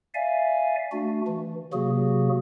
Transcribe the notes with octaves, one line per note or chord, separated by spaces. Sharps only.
D5 E5 F5 G#5
A3 D4 F#4
E3
C3 F#3 A#3 F#4 G#4